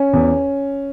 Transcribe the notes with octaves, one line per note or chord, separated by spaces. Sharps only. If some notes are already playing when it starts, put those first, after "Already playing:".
Already playing: C#4
E2